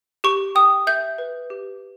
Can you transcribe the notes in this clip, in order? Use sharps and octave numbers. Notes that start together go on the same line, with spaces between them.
G4 C#6
G5 D#6
E5 G6
B4
G4